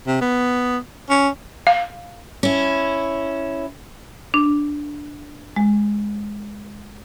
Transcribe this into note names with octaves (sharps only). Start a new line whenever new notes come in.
C3
B3
C#4
F5
C#4 E4
D4
G#3